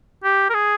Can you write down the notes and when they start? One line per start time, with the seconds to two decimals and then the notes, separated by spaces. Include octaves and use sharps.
0.24 G4
0.50 A#4
0.54 G#4